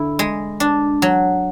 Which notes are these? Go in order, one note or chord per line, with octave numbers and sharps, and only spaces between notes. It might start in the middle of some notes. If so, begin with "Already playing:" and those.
Already playing: D3 E4
G#3
D4
F#3